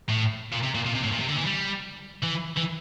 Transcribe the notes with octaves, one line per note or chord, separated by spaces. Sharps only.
A2
A#2
C3
A#2
A#2
C3
A2
A#2
C3
D3
E3
G3
E3
E3